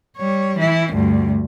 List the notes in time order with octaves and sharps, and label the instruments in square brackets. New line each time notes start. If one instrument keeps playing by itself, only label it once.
[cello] G3 C#5
E3 E4
D2 G2